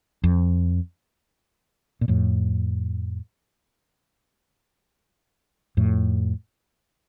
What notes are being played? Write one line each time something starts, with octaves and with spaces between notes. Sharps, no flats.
F2
A#2
F2 A2
F2 A2